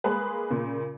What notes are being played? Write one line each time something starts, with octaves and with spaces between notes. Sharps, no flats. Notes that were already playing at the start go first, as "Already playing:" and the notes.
G#3 A#3 G#4 B4
A#2 C#3